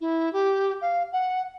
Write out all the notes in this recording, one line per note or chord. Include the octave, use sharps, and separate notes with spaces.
E4
G4
F5
F#5